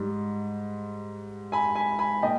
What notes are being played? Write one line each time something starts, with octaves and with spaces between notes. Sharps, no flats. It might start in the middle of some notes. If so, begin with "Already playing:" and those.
Already playing: G#2 G3
G#5 B5
G#5 B5
G#5 B5
A#2 D#5 G5